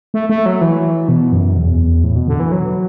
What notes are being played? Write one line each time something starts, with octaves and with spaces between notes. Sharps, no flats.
A3
A3
F#3
E3
B2
F#2
E2
A2
B2
D3
E3
F#3